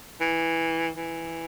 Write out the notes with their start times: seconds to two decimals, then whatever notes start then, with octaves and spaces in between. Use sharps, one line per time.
0.21 E3
0.97 E3